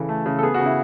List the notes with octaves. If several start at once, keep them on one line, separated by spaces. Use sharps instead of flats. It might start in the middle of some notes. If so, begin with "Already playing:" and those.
Already playing: C#3 E3 A4
A3
C#3
A4
B3 G#4
F#4
C#3
E4